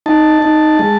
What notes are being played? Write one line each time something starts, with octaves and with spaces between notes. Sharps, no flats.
D#4 A5
D#4
G#3